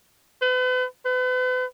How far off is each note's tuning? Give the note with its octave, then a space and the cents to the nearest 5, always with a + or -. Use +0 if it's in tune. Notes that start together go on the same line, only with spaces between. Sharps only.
B4 +40
B4 +40